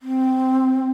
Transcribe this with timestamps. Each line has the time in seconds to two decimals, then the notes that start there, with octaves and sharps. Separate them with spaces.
0.01 C4